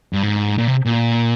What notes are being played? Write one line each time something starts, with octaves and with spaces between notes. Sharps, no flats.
G2
G#2
A#2
C3
A#2